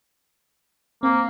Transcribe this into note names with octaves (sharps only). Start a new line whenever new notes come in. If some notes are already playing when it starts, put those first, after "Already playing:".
A#3 C4